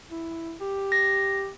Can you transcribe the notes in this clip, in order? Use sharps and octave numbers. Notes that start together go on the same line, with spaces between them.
E4
G4
A#6